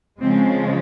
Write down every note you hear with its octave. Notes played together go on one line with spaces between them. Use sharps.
C#3 F3 G#3 C4